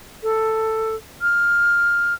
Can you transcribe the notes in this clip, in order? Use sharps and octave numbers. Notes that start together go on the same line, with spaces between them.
A4
F6